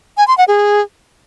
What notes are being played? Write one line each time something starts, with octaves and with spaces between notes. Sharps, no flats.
G#5
C6
F#5
G#4